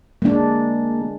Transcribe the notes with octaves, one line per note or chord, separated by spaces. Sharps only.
G#3 A#3 D4